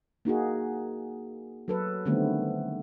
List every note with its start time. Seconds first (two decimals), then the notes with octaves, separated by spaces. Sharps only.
0.25 A#3 D#4 F#4 G#4
1.68 F#3 A4 B4
2.05 D3 D#3 G3 A3 B3 C4